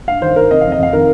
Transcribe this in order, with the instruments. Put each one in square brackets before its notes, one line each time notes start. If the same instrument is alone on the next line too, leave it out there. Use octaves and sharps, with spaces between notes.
[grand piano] G2 F5
D#3 C5
D#3 A#4
C3 D#5
F2 F5
D#5
F2 F5
D#3 A#4